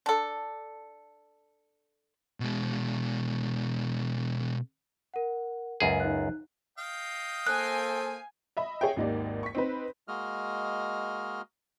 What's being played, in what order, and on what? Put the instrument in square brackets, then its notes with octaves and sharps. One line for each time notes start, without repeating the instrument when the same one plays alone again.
[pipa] D4 A4
[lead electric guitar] B2 G#3
[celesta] A#4 F#5
[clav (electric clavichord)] C#2 F#2 G#4 [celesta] G#5
[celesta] D#4 F#6
[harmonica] D#5 F5 G5
[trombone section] A#3 A4 C5 [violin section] G#5 [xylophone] F#6
[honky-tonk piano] D#5 E5 B5
G#4 C#5 D#5 E5 G5
G#1 D#2 D#4 G4 D5
C#6 B6
C4 D#4 B4
[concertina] G#3 A#3 F#4 D#5 F6